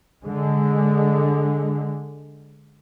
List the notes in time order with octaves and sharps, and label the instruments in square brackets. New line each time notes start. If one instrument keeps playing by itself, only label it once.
[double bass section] D3 G#3